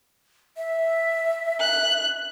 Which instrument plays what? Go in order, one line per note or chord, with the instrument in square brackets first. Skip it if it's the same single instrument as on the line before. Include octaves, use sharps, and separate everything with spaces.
[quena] E5
[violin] F#6